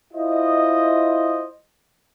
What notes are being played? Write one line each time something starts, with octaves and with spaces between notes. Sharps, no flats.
E4 F4 C5 D#5